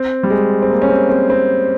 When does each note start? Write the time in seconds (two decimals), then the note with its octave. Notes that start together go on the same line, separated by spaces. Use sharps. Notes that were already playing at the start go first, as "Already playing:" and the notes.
Already playing: C4
0.23 G3
0.30 G#3
0.62 C4
0.70 A#3
0.82 C#4
0.89 C4
1.09 C4
1.30 C4